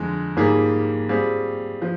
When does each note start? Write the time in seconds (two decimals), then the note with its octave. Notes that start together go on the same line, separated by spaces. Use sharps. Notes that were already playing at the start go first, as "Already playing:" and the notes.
Already playing: F2 D3 G#3
0.37 G#2 G3 A#3 F4 G#4
1.09 G3 C4 F4 G#4
1.82 F3